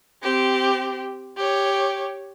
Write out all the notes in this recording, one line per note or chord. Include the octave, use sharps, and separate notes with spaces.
C4 G4
G4 C#5